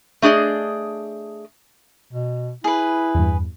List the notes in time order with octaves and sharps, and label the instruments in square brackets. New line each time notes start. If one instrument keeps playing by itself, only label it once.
[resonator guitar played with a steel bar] A3 D4 G#4 D5 D#5
[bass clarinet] B2
[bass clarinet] E4 [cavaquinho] G#4 B4
[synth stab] E2 G2